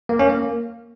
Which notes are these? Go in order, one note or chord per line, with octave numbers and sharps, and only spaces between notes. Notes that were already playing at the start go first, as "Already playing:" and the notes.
A#3
C#4
A#3